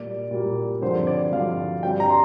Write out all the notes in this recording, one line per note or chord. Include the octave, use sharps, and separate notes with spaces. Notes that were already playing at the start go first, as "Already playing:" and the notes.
Already playing: A#2 G3 A#3 D5
A#2 G3 A#3
G2 D3 F3 C4 C5
D5
G2 D3 F3 C4 F5
G2 G3 C4 G5
A#5
C6